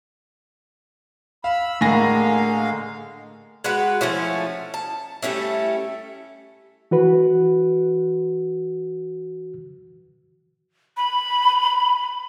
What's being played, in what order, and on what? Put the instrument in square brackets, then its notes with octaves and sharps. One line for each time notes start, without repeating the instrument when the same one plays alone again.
[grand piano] F5 [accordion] B5 E6
[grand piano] A2 G#5 A#6 [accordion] D3 G#3 F5 [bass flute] A#3
[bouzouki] G#3 F#4 B4 F#5
F3 A3 C#4 E4
A5
G3 A3 C#4 E4
[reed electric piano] E3 F#4 B4
[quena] B5